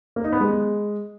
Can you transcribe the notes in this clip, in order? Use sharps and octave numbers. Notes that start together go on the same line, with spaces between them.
A#3
D#4
B3
G#3